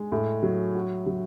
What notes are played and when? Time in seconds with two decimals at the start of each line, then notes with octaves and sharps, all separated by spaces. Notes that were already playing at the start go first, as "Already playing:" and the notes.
Already playing: G#3
0.12 A2
0.43 F#3
0.75 F#4
1.06 F#3